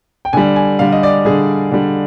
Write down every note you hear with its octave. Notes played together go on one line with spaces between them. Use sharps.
G5
D3 G3 G#5
G#5
D3 G3 F5
D#5
D5
D3 G3 G#4
D3 G3